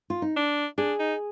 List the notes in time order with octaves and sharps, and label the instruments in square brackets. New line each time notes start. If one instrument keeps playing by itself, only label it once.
[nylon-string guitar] F4
D#4
[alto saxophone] D4
[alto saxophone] D4 [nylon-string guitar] G#4
[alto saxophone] D#4